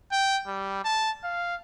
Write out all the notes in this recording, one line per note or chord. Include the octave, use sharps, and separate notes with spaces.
G5
G3
A5
F5